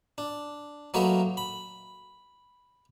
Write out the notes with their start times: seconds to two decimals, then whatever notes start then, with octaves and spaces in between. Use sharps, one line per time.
0.18 D4
0.94 F#3 A3 A#3 A#4 B4 D#5
1.37 B5